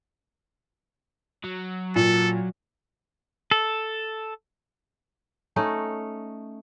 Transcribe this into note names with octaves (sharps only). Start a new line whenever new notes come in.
F#3
A#2 A4
A4
A3 C#4 D#4